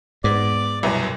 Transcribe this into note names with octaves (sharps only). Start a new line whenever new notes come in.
G#2 B3 D5 D6
C2 F#2 B2